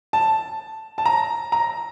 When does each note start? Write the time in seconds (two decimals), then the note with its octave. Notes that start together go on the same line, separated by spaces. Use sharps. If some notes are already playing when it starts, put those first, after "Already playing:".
0.13 A5
0.98 A5
1.06 A#5
1.52 A#5